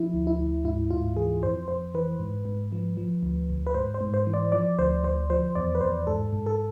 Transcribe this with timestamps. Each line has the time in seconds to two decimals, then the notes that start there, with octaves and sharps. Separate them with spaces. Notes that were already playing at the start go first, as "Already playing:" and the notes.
Already playing: F3 E4
0.14 D2
0.27 E4
0.39 D2
0.64 G#2 E4
0.90 G#2 F4
1.16 E3 G#4
1.43 F2 C5
1.68 F2 C5
1.94 E3 B4
2.19 G#2
2.45 G#2
2.72 F3
2.97 F3
3.23 D2
3.50 D2
3.67 B4
3.74 G#2 C5
3.94 C5
4.01 G#2
4.14 C5
4.27 E3
4.34 D5
4.52 F3 D5
4.79 D2 C5
5.04 D2 C5
5.30 F3 C5
5.55 E2 D5
5.75 B4
5.81 E2 C5
6.07 G#2 A4
6.33 G#2
6.46 A4